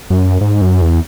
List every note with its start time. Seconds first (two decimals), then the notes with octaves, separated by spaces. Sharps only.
0.10 F#2
0.41 G#2
0.61 F#2
0.82 E2